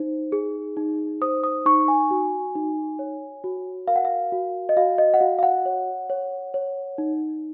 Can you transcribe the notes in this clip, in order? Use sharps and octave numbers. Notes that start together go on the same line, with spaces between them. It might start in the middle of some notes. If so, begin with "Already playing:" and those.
Already playing: D#4 C5
G#4
D#4
C5 D#6
D#6
D#4 C#6
G#5
F#4
D#4
C#5
F#4
A#4 F5
F#5
F5
F#4
D#5
F#4 F5
D#5
F#5
F#4 F5
F5
F#5
C#5
C#5
C#5
D#4